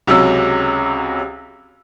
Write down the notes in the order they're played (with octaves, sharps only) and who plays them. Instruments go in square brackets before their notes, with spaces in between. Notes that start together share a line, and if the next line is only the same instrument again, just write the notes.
[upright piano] C#2 C3 F#3 C#4 E6